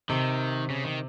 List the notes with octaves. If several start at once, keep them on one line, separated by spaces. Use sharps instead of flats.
C3 D#3
C#3
D#3